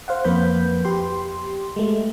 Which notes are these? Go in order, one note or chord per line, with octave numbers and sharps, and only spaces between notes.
C5 F5 F#5
F2 A#3 B4 B5 G6
G4 C6
G#3 A3